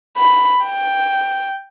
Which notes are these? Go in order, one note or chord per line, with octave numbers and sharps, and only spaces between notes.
B5
G5